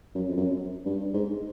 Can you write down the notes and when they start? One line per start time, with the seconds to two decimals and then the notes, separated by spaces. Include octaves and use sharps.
0.15 F#2
0.29 F2
0.37 F#2
0.86 G2
1.14 G#2